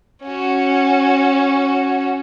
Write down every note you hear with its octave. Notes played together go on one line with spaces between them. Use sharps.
C#4 F#4